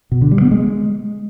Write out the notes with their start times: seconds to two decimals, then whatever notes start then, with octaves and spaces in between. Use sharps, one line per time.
0.12 B2
0.21 D3
0.31 G3
0.41 B3
0.51 G#3